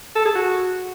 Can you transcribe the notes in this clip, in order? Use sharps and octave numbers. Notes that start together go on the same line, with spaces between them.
A4
G#4
F#4